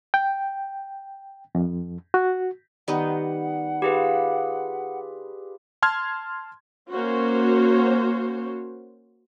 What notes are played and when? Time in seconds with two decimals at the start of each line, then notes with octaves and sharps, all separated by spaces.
0.14 G5
1.55 F2
2.14 F#4
2.88 D#3 G3 B3 D#4 F#5
3.82 F4 G4 G#4 B4 D5 B5
5.82 A5 C6 F6 G#6
6.92 A#3 C#4 F#4 C5 C#5